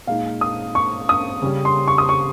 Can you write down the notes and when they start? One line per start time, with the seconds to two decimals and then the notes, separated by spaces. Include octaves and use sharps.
0.07 A#2 G#3 D#4 F5
0.41 D#6
0.75 C#6
1.09 D#6
1.42 C#3 G3 C#4
1.65 C6
1.88 C#6
1.98 D#6
2.09 C#6